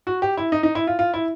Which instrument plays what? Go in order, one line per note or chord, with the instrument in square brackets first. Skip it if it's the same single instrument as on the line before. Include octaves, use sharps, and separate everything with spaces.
[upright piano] F#4
G4
E4
D#4
D#4
E4
F4
F4
E4